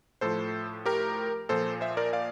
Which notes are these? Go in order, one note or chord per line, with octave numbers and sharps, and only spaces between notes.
A2 F3 A4 C5
G4 A#4
A#2 F3 A4 C5
C5 E5
A#4 D5
D5 F5